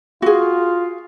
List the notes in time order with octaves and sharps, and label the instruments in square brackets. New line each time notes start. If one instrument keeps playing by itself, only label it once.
[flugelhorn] F4 [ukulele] F#4 G#4